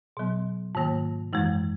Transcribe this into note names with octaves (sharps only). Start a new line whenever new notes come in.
B2 F#3 B3
G#2 D#3 A#3
F#2 E3 G#3